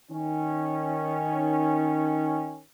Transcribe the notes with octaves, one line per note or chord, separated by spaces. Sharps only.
D#3 C#4